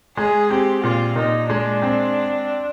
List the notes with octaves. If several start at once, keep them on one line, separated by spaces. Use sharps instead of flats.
G#3 G#4
C4 G4
A#2 F4
A#2 D#4
G#3 D4
C4